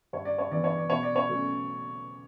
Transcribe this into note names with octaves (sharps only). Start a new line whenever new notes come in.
G2 C#5
D5
C#5
E3 B3 D4 D5
C#5
D5
B2 C#5
D5
C#5
F#3 A3 C#4